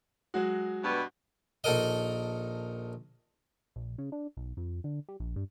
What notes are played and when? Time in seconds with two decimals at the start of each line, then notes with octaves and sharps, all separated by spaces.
0.34 F#3 G#3 F#4
0.84 G2 B2
1.64 A#1 D#4 A4 A#4 D#5
3.76 A#1
3.98 C#3
4.12 D4
4.37 B1
4.57 F2
4.84 D3
5.09 G3
5.20 A#1
5.36 G2